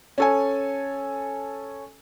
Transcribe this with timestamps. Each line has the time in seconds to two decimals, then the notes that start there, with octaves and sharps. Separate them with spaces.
0.18 C#4 A4 G#5